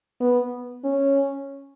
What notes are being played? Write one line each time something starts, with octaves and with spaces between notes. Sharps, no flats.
B3
C#4